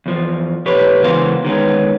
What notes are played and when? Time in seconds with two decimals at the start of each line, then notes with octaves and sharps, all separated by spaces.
0.06 E2 F3
0.66 B2 G4 B4 C#5
1.02 C#2 E3 B3 F#4 C5 F5
1.45 D#3 G#3 B3 C#4